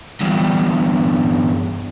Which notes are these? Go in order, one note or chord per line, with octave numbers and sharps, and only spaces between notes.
E2 G2